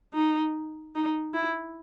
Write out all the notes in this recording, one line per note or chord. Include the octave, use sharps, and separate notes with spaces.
D#4
D#4
E4